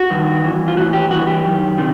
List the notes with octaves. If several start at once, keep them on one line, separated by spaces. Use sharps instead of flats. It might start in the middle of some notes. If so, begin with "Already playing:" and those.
Already playing: F#4
G2 D#3
G2 E3
F4
A2 E3 F#4
G4
G2 E3 F#4
G4
F#2 D#3
C3 D#3